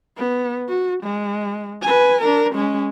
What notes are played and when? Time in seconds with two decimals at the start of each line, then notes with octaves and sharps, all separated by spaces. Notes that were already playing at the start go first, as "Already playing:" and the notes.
0.17 B3
0.69 F#4
1.03 G#3
1.83 B4 G#5
2.22 D4 A#4
2.53 G#3 C#4